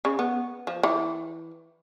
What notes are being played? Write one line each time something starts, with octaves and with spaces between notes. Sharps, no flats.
C#3
B3
F3
E3